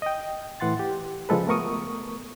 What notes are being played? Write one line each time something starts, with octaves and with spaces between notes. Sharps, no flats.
D#5 G5
A2 E3 F#5 C6 A6
G4
C#3 F3 G#3 A4 B4
A3 B3 A#4 C#6 D#6